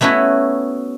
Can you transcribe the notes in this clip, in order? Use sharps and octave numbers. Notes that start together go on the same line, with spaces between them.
A3 B3 C#4 E4 F#4